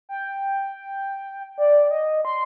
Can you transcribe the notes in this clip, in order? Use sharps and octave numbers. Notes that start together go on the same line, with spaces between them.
G5
D5
D#5
C6